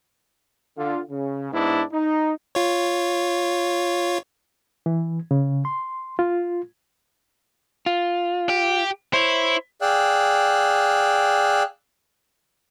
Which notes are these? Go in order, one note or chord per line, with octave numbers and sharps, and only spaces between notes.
D3 F4
C#3
G#2 B3 D4 E4
D#4
F4 C#5
E3
C#3
C6
F4
F4
G4
E4 C5 C#5
G#4 D5 F5 G5 E6 F#6